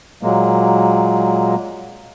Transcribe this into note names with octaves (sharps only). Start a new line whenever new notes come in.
A#2 F#3 G#3 A#3